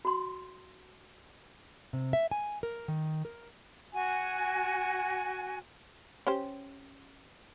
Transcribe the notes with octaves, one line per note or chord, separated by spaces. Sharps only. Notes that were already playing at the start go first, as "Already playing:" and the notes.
F#4 C6
C3
E5
G#5
A#4
D#3
A#4
F#4 G#5
C#4 G4 C5